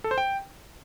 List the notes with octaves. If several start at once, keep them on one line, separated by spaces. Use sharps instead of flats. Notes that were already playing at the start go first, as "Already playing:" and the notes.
A4
C5
G5